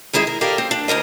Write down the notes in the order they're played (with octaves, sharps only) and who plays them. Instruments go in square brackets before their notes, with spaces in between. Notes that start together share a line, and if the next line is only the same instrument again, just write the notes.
[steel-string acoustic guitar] D#3 G#3 E4 G#4 E5
A#4
G4 A4 A#4 D5 D#5 F5
C4
D4
D2 F3 A#4 D#5